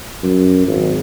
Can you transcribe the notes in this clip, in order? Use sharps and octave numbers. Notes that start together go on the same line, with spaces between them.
F#2
G#1